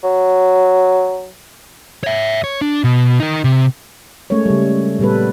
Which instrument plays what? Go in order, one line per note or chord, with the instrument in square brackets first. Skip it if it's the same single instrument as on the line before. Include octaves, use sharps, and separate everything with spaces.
[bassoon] F#3
[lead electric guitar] C#5 E5
C#5
D4
B2
D#4 A#4
C3
[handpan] G#3 A3 C#4 A#4 C#5
C#3 G3
A#2 G3 B3 A4 B4